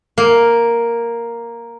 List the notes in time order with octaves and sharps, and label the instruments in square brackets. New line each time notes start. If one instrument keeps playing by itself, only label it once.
[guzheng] A#3